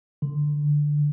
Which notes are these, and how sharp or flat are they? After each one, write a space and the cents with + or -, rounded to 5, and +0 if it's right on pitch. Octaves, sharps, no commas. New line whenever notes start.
D3 +5